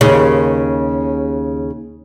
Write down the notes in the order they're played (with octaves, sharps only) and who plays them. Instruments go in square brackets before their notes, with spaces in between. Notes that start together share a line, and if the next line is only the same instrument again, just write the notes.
[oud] D#2 C#3